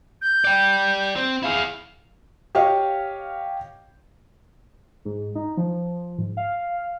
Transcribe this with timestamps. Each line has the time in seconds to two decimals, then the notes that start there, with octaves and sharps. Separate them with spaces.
0.22 G6
0.45 D5 G5
1.16 C4
1.43 E4 G#4 F5
2.55 G4 C#5 D#5 F5
5.05 G#2
5.35 D#4
5.57 F3
6.18 G#2
6.37 F5